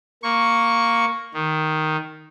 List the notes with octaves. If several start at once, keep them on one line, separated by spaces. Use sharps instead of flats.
A#3 C#6
D#3